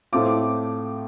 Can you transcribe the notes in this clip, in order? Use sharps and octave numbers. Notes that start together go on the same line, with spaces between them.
A2 A3 C4 F4 D6